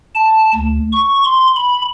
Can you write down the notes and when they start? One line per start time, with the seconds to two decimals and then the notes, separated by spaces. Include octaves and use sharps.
0.15 A5
0.55 D2
0.92 C#6
1.25 C6
1.56 B5